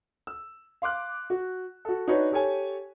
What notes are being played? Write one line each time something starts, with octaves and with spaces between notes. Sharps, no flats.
E6
F5 C6 D6 F#6
F#4
F#4 A4
D4 D#4 F#4 B4 C#5
G4 A4 C#5 G#5